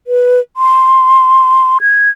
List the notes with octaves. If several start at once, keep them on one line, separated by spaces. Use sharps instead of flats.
B4
C6
G#6